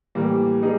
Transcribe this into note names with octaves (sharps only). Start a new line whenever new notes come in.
A2 E3 G3 A#3
G3 D#4 G#4